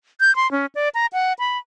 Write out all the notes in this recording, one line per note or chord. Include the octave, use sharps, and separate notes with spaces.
G6
C6
C#4
D5
A#5
F#5
B5